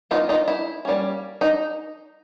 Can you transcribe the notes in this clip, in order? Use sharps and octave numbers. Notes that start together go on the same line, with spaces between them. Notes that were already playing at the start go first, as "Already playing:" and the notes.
F#3 B3 D#4 F4
D#3
D#4 F4
E4
G3 A#3 C#4
D#4